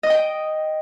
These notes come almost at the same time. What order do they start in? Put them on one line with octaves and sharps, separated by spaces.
D#5 D#6 G5